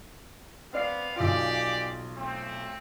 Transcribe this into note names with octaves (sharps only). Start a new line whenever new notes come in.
B3 C4 D5 F5 C7
B1 F4 G4 G#4 D5
A3 C4